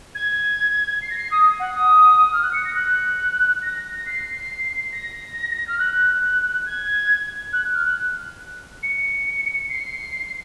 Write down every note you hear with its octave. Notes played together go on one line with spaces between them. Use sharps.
G#6
C7
A#6
C7
D#6
F#5
D#6
F6
F#6
C#7
A#6
F#6
A#6
A#6
C7
A#6
F6
F#6
G#6
F#6
F6
F#6
C#7
C7